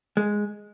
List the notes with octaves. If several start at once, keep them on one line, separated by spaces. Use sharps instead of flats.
G#3